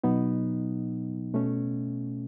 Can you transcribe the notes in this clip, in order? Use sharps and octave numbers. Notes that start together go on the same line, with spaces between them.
B2 F#3 B3 D#4
B2 A3 C#4